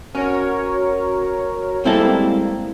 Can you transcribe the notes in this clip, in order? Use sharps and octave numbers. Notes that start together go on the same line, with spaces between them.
C#4 F#4 A#4 C#5
G3 G#3 A#3 C4 E4 A4